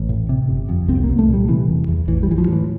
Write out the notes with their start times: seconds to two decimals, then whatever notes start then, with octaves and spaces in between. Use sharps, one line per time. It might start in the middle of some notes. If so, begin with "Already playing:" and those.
Already playing: A1
0.09 A2
0.29 C3
0.49 G1
0.69 F2
0.88 C2 C4
1.04 C2 A#3
1.19 A3
1.29 A#2
1.34 G3
1.48 C3 E3
1.68 E1
1.88 E2
2.08 A1 E3
2.23 G3
2.28 A1 E3
2.38 F3
2.48 A2 E3